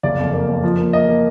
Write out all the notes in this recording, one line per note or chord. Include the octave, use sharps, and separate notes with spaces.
F#1 D5
F2
A#3
F2
F3
A#3
A#3 D#5
A#3